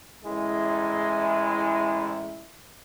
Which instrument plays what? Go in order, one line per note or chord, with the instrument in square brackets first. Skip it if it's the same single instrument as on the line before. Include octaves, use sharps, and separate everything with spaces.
[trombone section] A1 E4 [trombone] G#3